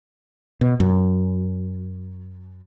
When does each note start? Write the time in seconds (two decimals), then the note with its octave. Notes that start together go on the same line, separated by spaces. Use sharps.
0.61 B2
0.80 F#2